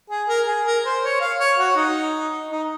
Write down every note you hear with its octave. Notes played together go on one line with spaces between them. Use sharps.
G#4
A#4
G#4
A#4
C5
C#5
F5
C#5
F#4
D#4
D#4